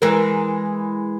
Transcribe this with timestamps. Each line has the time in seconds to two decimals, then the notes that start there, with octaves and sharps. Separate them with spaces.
0.02 E3 G#3 A#4